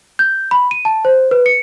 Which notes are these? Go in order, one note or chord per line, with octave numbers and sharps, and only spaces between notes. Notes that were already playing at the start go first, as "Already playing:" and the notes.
G6
B5
D#7
A5
C5
B4
C#7